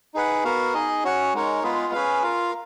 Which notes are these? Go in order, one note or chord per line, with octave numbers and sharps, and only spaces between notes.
D#4 G#4 B4 F#5
B3 F#4 A#4 F5
D#4 G#4 D#5
C#4 F#4 C#5 F#5
G#3 D#4 A#4 C#5
G#3 B3 F4 G#4 B4
C#4 G#4 B4 F5
F4 A#4 F5